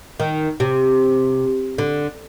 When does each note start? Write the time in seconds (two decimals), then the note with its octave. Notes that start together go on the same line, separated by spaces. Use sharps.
0.20 D#3
0.60 C3
1.78 D3